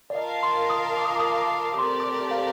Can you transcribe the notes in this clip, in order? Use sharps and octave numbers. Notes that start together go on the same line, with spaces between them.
D5
F4 A#4 D#5 F5 A5
C6
D#6
D6
D#6
D6
D#6
D6
D6
D6
A3 C4 G4 A#4 D5 C6
D6
F5